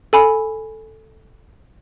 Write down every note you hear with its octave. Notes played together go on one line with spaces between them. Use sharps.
A4 G#5 B5